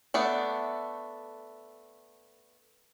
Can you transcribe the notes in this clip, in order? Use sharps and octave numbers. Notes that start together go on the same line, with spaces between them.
A3 B3 D4